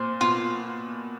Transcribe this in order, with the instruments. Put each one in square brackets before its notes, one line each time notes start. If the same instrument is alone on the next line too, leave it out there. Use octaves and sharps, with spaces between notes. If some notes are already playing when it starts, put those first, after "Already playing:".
Already playing: [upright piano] A#2 [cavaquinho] C5
[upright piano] B2 [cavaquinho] F4